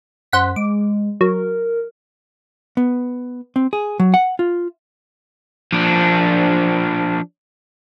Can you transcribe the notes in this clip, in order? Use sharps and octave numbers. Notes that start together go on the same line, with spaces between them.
F#2 C5 F#5 B6
G#3 D6
F#3 A#4
B3
C4
G#4
F#3
F#5
F4
F3 D4